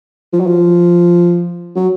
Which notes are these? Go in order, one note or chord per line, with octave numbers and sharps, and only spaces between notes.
F3
F#3
F3
F#3